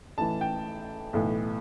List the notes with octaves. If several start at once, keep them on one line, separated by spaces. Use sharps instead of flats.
A1 A2 E3 A5
G5
B1 A2 E3